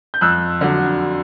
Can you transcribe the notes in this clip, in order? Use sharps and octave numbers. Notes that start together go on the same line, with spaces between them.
G6
F2 E6 F#6
D3 F#3